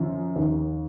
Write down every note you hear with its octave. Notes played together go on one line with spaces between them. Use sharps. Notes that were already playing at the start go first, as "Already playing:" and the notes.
Already playing: F#2 F3
D#2